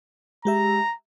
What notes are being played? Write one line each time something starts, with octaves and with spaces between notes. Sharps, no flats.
G#3 G4 E5 A#5